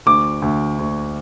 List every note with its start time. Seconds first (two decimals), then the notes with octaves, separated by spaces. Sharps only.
0.06 D2 D6
0.42 D2
0.79 D2